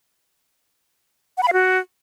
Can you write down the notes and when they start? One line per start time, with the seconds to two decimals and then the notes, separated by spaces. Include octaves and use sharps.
1.37 F#5
1.43 B5
1.48 F5
1.53 F#4